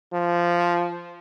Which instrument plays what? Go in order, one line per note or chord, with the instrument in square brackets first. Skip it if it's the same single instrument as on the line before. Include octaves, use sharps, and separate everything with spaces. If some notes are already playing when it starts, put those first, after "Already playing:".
[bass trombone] F3